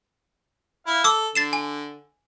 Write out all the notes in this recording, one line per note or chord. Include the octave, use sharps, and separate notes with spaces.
E4 F5
A4 D6 E6
D3 A6 C7 E7
G#5